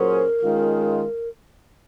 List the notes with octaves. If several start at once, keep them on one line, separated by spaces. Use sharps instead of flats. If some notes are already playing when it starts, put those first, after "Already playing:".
Already playing: A#2 F#3 C#4 G#4 A#4 C5
D#3 G#3 C#4 F4